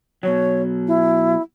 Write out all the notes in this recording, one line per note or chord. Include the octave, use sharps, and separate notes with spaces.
B2 F#3 C#5
E4